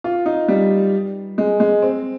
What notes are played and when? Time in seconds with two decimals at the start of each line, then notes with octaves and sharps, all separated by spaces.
0.04 F4
0.26 D#4
0.48 G3
1.38 G#3
1.60 G#3
1.82 C4